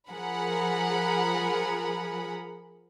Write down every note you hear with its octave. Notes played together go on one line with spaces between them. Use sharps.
F3 G#4 A#4 F#5 B5